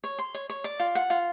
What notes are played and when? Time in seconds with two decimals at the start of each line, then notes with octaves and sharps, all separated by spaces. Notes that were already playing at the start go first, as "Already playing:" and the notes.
0.04 C#5
0.19 C6
0.35 C#5
0.50 C#5
0.64 D5
0.80 F4
0.95 F#5
1.10 F4